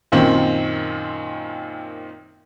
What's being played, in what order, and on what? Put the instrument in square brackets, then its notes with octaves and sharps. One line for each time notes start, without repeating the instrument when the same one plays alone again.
[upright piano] F#2 A#2 D#3 C4